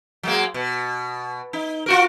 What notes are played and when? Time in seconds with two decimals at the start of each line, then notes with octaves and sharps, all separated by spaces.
0.23 F#3 G#3 A#3
0.54 B2
1.53 D#4
1.86 F4 F#4 A#4